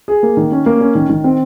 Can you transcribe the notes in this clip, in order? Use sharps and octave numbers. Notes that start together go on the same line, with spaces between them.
G#4
A#3
D#3
C#4
A#3
C#4
D#3
D#3
C4